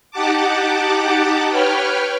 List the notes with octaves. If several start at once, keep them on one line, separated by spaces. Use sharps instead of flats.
D#4 G4 F#5 A5 D6
B4 C#5 G5 F6